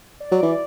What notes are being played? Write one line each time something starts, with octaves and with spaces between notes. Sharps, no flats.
D5
F#3
E3